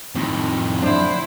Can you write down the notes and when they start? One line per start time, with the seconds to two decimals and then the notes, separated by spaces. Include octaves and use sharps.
0.15 F2 A2 D#3
0.82 D3 D4 E4 C5